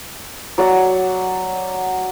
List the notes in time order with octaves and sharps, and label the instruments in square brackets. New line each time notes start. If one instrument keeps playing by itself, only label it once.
[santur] F#3 D5 F#5